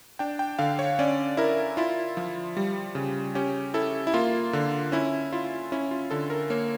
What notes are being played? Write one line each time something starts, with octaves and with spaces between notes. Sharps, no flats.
D4 G5
G5
D3 F5
C#5
C#4 D5
E4 A#4
E4 F4
F3
G3
C#3
C#4 G4
E4 A4
E4
A#3 F4
D3
C#4 E4
E4 F4
C#4 E4
F4
D3 A4
A#4
A#3 C#5